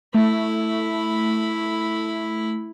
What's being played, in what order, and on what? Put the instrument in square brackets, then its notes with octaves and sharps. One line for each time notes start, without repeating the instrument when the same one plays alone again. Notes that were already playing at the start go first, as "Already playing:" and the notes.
[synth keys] A3 [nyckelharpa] E4 B5